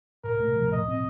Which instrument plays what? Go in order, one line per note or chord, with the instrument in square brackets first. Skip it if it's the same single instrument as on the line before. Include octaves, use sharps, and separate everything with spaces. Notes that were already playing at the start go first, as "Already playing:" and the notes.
[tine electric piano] A2 [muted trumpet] A#4
[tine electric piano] A3
F3
[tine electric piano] A2 [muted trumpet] D#5
[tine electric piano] C4